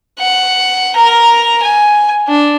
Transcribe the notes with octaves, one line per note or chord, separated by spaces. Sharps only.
F#5
A#4 A#5
G#5
D4